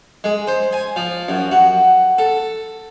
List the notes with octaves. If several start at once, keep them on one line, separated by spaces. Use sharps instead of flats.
G#3
C5
G#5
F3
F#2
F#4
A4